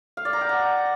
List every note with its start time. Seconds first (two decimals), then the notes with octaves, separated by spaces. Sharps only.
0.17 F5
0.25 D5
0.33 A#5
0.41 G5
0.49 F#5